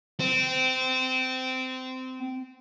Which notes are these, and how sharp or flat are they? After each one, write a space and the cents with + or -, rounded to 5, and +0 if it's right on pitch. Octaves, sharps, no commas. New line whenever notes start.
C4 -20